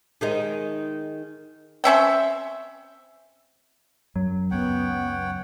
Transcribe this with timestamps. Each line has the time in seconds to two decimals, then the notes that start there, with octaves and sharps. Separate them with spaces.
0.21 D#3 G#3 D#4
1.84 C4 C#4 E5 G5
4.16 F#2 F#3
4.51 C#2 F#2 B3 C#5 F#5 G5